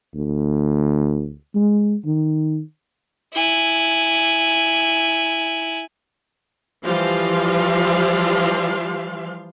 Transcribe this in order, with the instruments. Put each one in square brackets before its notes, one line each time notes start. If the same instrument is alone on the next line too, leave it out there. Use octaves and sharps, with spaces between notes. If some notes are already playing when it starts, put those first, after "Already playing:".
[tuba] D2
G#3
D#3
[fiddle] E4 G#5
[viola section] E3 F3 G3 F4 F5 C6